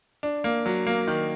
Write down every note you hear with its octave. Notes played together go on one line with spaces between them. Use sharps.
D4
A#3
F#3
A#3
D#3